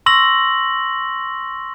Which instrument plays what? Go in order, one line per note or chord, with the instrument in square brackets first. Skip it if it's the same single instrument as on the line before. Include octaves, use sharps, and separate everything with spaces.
[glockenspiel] C6 C#6 E6 A#6 F#7